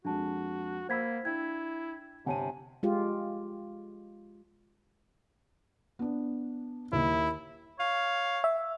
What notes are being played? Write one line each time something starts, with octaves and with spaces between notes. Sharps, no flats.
F2 G#3 D4 F#4 A5
A#3 C5 F#5 B5 E6 G#6 B6
D4 E4 G5 G#6
G1 C3 C#5 F#5 G#5 A5 D#7
G#3 F4 G4
B3 D4
D#2 D#3 E4
C#5 F5
E5